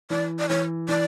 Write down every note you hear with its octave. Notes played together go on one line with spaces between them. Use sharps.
E3 D5
D5
E3 C#5
E3 D5